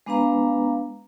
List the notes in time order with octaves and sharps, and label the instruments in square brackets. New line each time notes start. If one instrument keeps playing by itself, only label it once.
[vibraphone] G#3 B3 D4 B4 F5 A#5